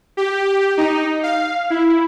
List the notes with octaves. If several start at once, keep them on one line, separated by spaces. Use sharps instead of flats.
G4
D#4
F5
E4